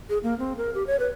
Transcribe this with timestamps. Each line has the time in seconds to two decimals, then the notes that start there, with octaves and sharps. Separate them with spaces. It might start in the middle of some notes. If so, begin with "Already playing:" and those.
0.09 G#4
0.23 A#3
0.39 C4
0.58 A#4
0.74 G4
0.87 C#5
0.99 B4